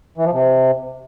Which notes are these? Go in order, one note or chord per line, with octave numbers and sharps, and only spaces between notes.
E3
F3
C3